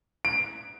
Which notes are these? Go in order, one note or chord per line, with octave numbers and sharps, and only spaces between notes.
D7